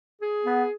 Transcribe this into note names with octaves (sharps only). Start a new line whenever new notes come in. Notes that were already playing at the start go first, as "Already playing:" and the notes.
G#4
B3